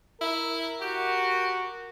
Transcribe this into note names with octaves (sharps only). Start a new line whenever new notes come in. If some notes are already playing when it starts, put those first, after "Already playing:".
E4 A#4
F#4 G4